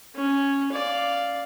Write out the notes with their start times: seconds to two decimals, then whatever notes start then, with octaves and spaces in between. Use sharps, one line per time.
0.16 C#4
0.72 D5 F5